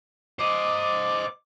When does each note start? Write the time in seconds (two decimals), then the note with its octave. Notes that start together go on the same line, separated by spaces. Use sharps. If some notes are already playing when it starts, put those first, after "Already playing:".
0.39 C5 D#5 D6